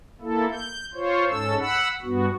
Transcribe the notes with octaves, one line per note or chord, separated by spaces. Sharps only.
A#3 E4 A4
G6
F4 C5 C#5
G#2 C#4 A4 E6
F#5 B5 E6
G2 B3 F#4